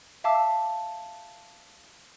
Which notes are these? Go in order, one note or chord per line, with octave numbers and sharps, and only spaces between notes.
E5 F5 A5 D6 E6